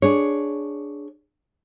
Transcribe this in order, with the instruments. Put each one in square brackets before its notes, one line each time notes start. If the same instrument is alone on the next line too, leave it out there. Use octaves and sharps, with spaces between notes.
[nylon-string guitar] D4 G#4 C#5